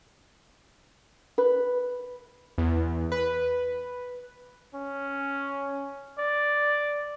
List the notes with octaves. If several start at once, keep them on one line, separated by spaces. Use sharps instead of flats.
B4
E2
B4
C#4
D5